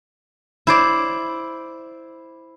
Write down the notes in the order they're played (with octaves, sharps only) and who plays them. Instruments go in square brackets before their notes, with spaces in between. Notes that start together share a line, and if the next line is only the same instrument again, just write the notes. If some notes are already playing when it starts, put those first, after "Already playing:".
[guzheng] E4 C5 D5